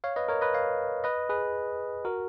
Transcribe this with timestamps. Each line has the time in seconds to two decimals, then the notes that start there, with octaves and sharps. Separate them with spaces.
0.04 C#5 F5
0.16 B4 D#5
0.29 A#4 C#5
0.41 B4 D#5
0.54 C#5 F5
1.04 B4 D#5
1.29 G#4 B4
2.05 F#4 A#4